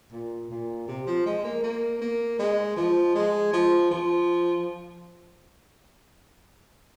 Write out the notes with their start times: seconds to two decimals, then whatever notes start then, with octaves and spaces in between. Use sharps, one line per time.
0.12 A#2
0.50 A#2
0.88 C3
1.07 F3
1.26 G#3
1.44 A#3
1.64 A#3
2.02 A#3
2.39 G#3
2.77 F3
3.15 G#3
3.53 F3
3.91 F3